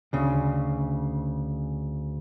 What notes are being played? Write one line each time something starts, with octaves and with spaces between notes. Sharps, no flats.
D2 C#3